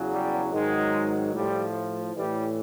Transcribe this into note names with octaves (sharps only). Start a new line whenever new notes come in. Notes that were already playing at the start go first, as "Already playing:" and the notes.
Already playing: E2 C#3 F#3
G3
G#2 D#3 F#3 G#3
A2 F3 G3
A2 E3 G3